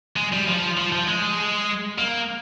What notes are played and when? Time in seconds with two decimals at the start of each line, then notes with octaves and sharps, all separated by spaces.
0.16 G#3
0.32 G3
0.48 F3
0.77 F3
0.92 F3
1.08 G#3
1.98 A#3